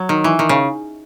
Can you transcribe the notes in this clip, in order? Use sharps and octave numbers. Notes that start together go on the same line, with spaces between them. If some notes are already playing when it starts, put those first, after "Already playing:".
Already playing: F#3
D#3
E3
D#3
C#3